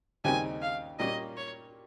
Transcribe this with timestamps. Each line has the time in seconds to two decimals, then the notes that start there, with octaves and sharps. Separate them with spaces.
0.24 D#2 C#3 G3 C4 D#4 G#5
0.62 F5
0.99 A#2 G3 A#3 C#4 D#5
1.37 C#5